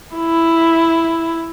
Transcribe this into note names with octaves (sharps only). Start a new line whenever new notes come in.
E4